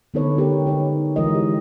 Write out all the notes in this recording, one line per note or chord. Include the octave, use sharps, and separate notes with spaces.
D3 B3 D#4 A4 B4 C#5
G#3 B3 D#4 G4 A#4 B4
D#4 C#5
E3 G#3 F4 A#4 D#5
G4